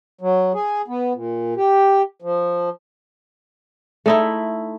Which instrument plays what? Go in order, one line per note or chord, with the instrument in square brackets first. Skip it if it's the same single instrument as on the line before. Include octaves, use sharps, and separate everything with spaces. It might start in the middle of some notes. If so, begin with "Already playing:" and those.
[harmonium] F#3
G#4
B3
A#2
G4
F3
[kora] A3 D#4 E4